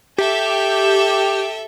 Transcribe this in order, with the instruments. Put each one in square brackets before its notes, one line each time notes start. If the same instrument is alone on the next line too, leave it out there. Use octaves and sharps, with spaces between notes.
[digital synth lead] G4 [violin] A4 E5